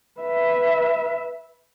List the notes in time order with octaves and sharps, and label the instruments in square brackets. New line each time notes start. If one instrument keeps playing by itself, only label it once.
[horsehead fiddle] B4 E5